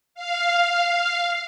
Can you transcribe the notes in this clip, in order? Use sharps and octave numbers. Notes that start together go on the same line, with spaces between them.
F5